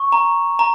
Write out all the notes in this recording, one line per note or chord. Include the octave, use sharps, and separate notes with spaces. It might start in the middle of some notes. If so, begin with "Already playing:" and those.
Already playing: C#6
A#5
A#5